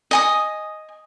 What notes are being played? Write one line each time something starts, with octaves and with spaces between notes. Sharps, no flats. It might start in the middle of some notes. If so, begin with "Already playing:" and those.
D#5 G#5 D#6